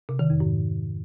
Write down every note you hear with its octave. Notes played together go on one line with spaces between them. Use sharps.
C3
D#3
F2
G#2